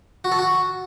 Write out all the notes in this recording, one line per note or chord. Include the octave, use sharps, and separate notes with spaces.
F#4
A4
F#4